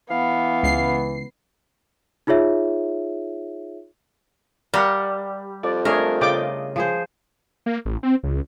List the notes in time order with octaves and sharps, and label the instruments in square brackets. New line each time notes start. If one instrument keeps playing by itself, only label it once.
[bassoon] E3 [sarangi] B3 [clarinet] F5
[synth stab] C#2 C7
[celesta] D#4 F4 G#4 C#5 E5
[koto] G3 [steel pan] A#4 F5 F#5
[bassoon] F2 [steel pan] D5
[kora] A3 [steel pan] D4 G#4 C#5 [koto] A#4
[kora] C#3 F4 D#5 [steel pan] D5 G5 D6
[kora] F3 G#4 C5
[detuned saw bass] A#3
A1
C4
C#2